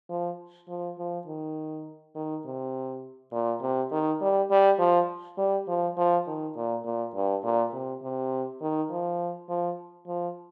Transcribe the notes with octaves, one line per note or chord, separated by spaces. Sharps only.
F3
F3
F3
D#3
D#3
C3
A#2
C3
D#3
G3
G3
F3
G3
F3
F3
D#3
A#2
A#2
G2
A#2
C3
C3
D#3
F3
F3
F3